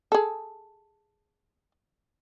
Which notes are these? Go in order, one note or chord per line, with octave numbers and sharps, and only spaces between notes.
G#4 A4